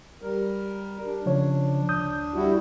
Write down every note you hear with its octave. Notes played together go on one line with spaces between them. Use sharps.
G3 A#4
D4
C#3 F3 C#5
D2 D#6 G6
G3 E4 F#4